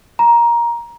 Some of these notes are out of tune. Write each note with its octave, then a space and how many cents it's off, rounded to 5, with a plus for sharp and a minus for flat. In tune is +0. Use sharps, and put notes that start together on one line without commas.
A#5 +15